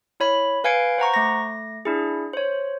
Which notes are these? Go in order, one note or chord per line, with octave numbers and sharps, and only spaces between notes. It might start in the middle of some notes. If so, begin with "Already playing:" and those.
E4 C#5 B5
B4 F5 G#5 G#6 C#7 D7
C5 F#5 A#5 C#6
A3 A#6
D4 E4 G#4
C5 C#5